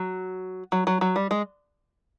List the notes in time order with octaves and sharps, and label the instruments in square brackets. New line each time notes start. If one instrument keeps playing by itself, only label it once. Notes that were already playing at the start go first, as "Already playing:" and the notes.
Already playing: [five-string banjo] F#3
F#3
F#3
F#3
G3
G#3